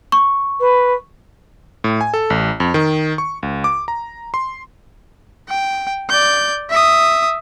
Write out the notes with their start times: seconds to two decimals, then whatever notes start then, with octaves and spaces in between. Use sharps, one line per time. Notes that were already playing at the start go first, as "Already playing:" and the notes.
0.12 C#6
0.60 B4
1.84 A2
2.01 G#5
2.14 A4
2.30 A1
2.60 F2
2.74 D#3
3.18 C#6
3.43 C#2
3.64 D6
3.88 A#5
4.34 C6
5.49 G5
6.10 D5 G6
6.70 E5 D#6